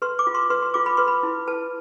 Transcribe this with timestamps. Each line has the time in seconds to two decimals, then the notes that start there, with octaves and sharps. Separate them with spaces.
0.02 B4 C6
0.19 D6
0.27 F4
0.35 C6
0.50 B4 C6
0.62 C6
0.74 F4 D6
0.86 B5
0.97 B4 C6
1.08 B5
1.23 E4
1.47 B4 A5